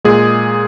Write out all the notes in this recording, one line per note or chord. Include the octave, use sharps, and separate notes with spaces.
A#2 G#3 G#4